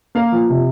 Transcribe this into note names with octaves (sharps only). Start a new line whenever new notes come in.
A#3 F5
F3
C3